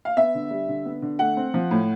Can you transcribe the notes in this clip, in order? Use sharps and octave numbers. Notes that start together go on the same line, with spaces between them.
F5
B3 E5
D3
G3
D3
B3
D3
A3 F#5
C4
F3
A2